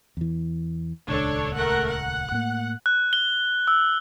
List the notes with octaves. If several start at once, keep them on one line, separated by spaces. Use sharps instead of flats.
E2 E3
D#1 C#2 D4 A4 C#5
A3 A#4 F#5
F#5
A2 A#3
F#6
G7
E6